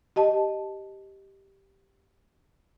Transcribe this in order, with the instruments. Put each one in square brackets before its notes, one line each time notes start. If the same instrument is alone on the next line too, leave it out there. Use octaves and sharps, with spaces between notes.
[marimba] G4 D#5 A5